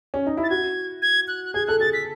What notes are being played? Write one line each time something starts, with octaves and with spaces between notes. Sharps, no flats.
C#4
D#4
E4
A6
F#4 G#6
G#6
F#6
F#6
G#4 G#6
A4 F#6
G#4 A6
B6